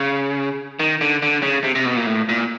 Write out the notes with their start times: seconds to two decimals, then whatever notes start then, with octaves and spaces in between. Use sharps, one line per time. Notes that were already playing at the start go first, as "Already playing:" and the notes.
Already playing: C#3
0.80 D#3
1.01 D3
1.22 D3
1.42 C#3
1.64 C3
1.75 C3
1.85 B2
1.96 A#2
2.07 A2
2.29 A#2